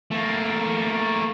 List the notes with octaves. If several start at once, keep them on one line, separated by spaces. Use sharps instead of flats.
A3 A#3